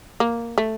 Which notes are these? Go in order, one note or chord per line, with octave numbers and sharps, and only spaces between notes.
A#3
A3